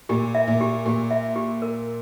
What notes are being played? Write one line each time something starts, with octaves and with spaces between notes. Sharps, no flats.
A#2 G4
E5
A#2
G4
A#2 G4
E5
G4
A#4